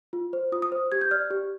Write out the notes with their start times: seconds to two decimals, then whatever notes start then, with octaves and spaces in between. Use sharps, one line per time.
0.13 F4
0.33 C5
0.52 F4 D#6
0.62 D#6
0.72 C5
0.92 G4 G#6
1.01 G6
1.11 D5 F6
1.31 G4